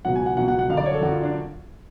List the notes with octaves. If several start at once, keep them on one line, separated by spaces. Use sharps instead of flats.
C#2 B2 F#3 F#5
G#5
F#5
C#2 B2 F#3 F#5
F#5
F#5
F#2 D3 F#3 F5
D5
C#5
A4
F#2 D3 F#3 F#4
F4
D4